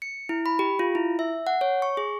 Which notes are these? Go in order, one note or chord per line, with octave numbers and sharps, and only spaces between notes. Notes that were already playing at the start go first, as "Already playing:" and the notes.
C#7
E4
B5
G4
F4
E4
E5
F#5
C#5
C#6
G#4